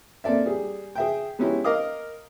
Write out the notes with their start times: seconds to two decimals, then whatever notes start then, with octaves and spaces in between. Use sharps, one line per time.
0.24 A#3 C4 A4 D5 E5
0.46 G3 G#4
0.95 G#4 E5 G5
1.39 G#3 B3 C#4 D#4 E4 G4
1.64 A#4 D#5 F5 D6 D#6